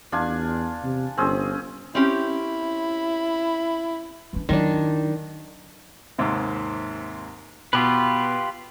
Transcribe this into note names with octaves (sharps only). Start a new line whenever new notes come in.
E2 D4 F4 G#5
C3
G1 C4 C#4 G#4
C4 C#4 E4 G4
E3 D4
D#3 F#3 D4 E4
D#2 G#2 C3
B2 F4 G4 B4